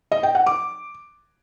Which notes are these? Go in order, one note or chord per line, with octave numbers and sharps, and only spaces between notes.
D#5
G5
F#5
D6